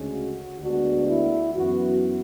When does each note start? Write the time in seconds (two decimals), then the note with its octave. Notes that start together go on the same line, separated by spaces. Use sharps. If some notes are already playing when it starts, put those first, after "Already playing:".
Already playing: D2 C#3 G#3 C#4
0.13 F#4
0.60 D2 D3 G#3 B3 D4 F#4
1.07 E4
1.55 F#2 E3 B3 F#4